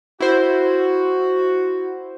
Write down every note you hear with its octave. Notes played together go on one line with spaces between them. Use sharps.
E4 F#4 C5